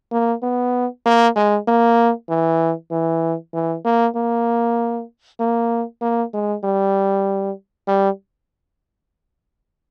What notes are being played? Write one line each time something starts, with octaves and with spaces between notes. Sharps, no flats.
A#3
B3
A#3
G#3
A#3
E3
E3
E3
A#3
A#3
A#3
A#3
G#3
G3
G3